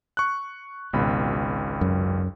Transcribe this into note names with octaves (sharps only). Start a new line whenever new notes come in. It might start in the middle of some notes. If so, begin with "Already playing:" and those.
C#6 F#6
G#1 C#2 B2 B5
F#2